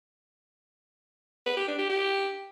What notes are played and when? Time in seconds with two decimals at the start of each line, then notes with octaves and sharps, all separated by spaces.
1.46 B4
1.57 G4
1.68 D4
1.78 G4
1.89 G4